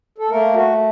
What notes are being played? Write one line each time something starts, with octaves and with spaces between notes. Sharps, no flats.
A4
A3 A#3 A#4
F#4